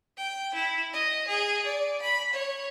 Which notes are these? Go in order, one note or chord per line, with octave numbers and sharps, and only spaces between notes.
G5
E4
D#5
G#4
D5
B5
C#5